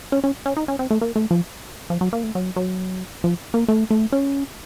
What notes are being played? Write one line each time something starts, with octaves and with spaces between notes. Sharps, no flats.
C#4
C#4
C#4
D#4
C#4
C4
A3
A#3
A3
F3
F3
F#3
A#3
A3
F#3
F#3
F3
A#3
A3
A3
C#4